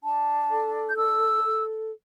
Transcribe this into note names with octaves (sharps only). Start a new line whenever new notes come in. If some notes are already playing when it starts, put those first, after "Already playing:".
D4 A5
A4
G6
D4 E6
A4